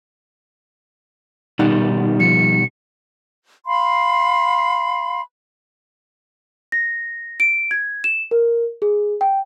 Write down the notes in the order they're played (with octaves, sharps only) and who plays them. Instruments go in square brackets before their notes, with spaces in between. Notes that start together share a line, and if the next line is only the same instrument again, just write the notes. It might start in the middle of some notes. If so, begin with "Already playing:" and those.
[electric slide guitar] B2 D#3 G3 [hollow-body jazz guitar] D#4 F#5
[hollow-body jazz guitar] F3 [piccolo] C#7
[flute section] F5 B5 C6
[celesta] A#6
D7
G#6
E7
A#4
G#4
G5